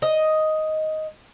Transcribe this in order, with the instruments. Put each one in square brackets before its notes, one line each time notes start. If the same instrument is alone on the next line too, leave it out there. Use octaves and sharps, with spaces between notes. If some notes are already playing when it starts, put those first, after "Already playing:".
[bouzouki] D#5